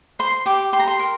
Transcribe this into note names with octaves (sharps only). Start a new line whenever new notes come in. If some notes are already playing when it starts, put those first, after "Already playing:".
C5 C6
G4 D6
G4 C6
A#5
C6
A#4